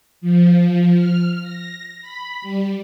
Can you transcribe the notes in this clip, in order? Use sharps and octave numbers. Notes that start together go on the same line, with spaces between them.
F3
F6
A#6
B5
G3